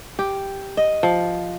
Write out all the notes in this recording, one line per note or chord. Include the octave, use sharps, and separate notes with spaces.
G4
D#5
F3